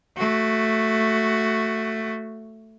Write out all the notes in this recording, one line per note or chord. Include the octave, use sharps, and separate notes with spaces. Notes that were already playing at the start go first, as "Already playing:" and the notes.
A3 F#4